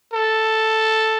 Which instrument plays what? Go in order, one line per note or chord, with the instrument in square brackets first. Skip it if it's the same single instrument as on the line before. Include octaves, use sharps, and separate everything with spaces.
[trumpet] A4